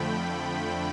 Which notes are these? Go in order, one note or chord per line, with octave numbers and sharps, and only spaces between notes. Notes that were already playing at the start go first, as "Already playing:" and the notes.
Already playing: F2 D3 F3 A3 G5 B5